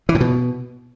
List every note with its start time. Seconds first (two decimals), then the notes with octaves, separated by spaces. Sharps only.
0.09 E3
0.15 A2
0.21 B2